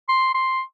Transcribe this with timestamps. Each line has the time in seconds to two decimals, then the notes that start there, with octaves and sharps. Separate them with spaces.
0.09 C6
0.34 C6